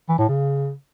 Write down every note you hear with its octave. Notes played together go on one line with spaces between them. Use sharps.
E3
A2
C#3